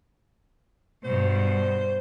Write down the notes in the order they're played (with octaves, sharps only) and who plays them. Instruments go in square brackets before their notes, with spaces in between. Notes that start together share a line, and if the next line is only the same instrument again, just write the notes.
[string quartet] G2 B2 [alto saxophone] C5